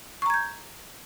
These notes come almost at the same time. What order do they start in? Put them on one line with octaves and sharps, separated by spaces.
C#6 A#5 G#6 G6